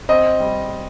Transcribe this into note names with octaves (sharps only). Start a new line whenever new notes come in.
C4 D#5
G3